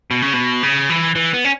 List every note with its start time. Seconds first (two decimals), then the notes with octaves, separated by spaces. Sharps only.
0.11 B2
0.22 C#3
0.33 B2
0.63 C#3
0.90 E3
1.15 E3
1.34 B3
1.45 C#4